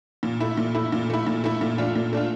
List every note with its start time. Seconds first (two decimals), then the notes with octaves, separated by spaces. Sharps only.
0.23 A#2
0.40 A3 E4
0.57 A#2
0.75 A3 E4
0.92 A#2
1.10 A3 E4
1.27 A#2
1.44 A3 E4
1.61 A#2
1.78 A3 D4 F4
1.96 A#2
2.13 A3 D4 F4